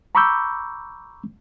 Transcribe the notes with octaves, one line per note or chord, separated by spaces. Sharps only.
A#5 B5 C#6 D6 E6 G6